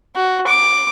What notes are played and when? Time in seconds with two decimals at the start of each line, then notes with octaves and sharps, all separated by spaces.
0.15 F#4
0.47 D6